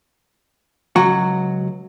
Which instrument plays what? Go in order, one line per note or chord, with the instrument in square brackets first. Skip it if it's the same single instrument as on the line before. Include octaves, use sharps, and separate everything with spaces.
[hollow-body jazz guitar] C#2 F#3 F#4